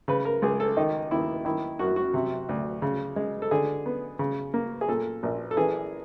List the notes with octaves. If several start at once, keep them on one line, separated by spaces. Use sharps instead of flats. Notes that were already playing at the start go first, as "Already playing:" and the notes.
C#3 B4
A#4
C#2 G#4
A4
D#3 D#4
D#2 E4
D#3 E4
F#2 F#4
F#4
C3
D2
C#3
G#3
A4
D3 G#4
B3
C#3
A#3
G#4
A#2 A4
A#1
A4
E3 G#4